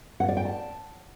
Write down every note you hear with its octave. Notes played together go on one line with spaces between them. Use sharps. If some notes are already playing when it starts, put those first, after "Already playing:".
F#5
D5
G5
A5